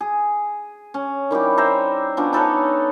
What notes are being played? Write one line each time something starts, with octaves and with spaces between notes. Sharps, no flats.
G#4
C#4
D#3 G3 E4 G4
C5 E5 A#5
F3 B3 C#4 D4
D#4 A4 B4 C#5